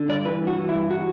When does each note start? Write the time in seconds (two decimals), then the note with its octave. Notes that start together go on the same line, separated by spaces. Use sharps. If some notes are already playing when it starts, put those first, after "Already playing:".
Already playing: D3
0.09 G2 D5
0.25 E3 B4
0.41 G2
0.47 F#4
0.58 E3
0.69 E4
0.74 G2
0.90 E3 F#4